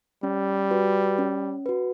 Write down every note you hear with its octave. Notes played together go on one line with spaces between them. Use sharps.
G3 C#4
F#4 B4
C#4
F#4 B4